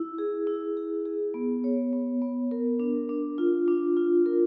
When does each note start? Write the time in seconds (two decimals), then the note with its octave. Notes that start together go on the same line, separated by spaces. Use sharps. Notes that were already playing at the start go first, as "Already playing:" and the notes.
Already playing: E4
0.18 G#4
0.47 E4
0.77 G#4
1.05 G#4
1.34 B3
1.64 C#5
1.93 B3
2.22 B3
2.51 A#4
2.80 D4
3.09 D4
3.38 F4
3.68 D4
3.97 F4
4.26 A#4